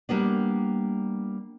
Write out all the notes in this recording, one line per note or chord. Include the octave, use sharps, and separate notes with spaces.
G3 A#3 B3 D4